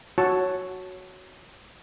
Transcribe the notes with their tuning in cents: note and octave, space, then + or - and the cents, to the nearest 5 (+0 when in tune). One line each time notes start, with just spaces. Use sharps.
F#4 +0 C#5 +0 A5 +0